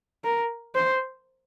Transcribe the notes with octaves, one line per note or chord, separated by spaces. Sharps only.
A#4
C5